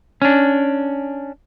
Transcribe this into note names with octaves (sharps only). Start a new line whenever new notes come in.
C#4 D4